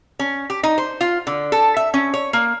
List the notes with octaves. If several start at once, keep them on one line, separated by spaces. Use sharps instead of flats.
C#4
G4
D#4
C5
F4
D3
A4
E5
C#4
C#5
A#3